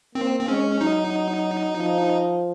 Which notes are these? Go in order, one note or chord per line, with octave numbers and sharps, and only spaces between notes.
A#3 C4
C4
G#3 C#4
F#3 D#4
F3